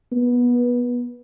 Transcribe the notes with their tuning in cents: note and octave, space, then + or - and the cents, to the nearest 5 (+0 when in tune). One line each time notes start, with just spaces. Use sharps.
B3 -20